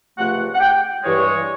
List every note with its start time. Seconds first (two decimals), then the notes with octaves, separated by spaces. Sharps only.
0.18 C#2 C3 F3 A3 F#5
0.55 F#5
0.60 G5
1.03 G2 E3 G#3 C#5